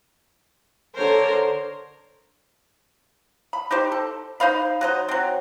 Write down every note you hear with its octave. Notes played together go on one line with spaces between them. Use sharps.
D3 A#4 C5 C#5
B5
D#4 G4 C5
A4
D#4 C5 F5 B5
F#3 D#4 C5
F#3 C4